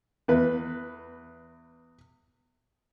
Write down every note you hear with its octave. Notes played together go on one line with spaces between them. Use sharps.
E2 B4